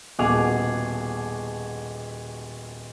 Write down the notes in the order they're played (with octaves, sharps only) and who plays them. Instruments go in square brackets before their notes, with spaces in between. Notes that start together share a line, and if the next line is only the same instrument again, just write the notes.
[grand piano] D#1 B2 F#4 G#4 D6 F7